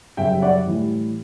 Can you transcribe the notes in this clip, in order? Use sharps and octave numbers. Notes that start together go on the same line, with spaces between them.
F#2 C#3 G3 E5 G5
E5
D5 F#5
A2 E3 G3